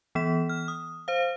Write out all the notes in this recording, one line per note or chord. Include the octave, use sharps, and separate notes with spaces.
E3 B3 B6 E7
F6
D#6
C5 F5